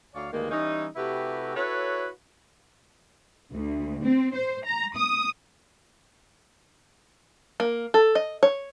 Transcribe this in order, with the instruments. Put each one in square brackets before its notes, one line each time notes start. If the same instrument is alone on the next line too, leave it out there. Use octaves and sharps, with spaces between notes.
[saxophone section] D2 C#5 D5 F5
D2 G2 D#3 G#3 A#3
E3 G3 C#4 D#4
C3 A3 E4 F#4 G4 B4
E4 F#4 A4 B4 C#5
[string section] D2
C4
C5
A#5
D#6
[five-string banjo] A#3
A4
D#5
C#5